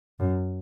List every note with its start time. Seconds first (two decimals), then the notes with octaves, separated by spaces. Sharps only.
0.19 F#2